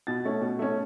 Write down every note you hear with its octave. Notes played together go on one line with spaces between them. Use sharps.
B2 A6
A3 C#4
B2
A3 C#4